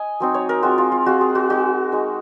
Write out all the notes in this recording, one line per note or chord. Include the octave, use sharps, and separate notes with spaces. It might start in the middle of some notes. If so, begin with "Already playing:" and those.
Already playing: D#5 G#5
F#3 C4 D#4
C#5
A#4
G#3 C4 F4 F#4
F4
F4
G#3 C4 F4 F#4
G#4
F#4
G#3 D#4 F#4
G#3 D#4